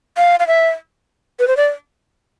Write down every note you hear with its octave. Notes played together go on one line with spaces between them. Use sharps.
F5
F5
E5
B4
C5
D5